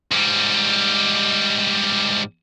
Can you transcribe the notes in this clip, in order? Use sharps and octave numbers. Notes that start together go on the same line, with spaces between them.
G#2 G3